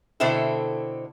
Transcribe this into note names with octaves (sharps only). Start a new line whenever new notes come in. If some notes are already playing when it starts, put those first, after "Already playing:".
B2 D3 C4 E4 A4